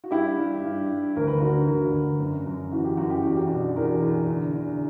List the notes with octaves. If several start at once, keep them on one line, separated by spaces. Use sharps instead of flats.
F#4
G2 E4 G4
G2
G2
G2
D2 A#4
B4
D3 F#4 A#4
D2 F#4 A#4
D2
F#2
F#2
E3 F#4
G4
F#2 F#4
G4
E2 F#4
G4
B2 D4 F#4
E2 F#4 A#4
E2
D3
D3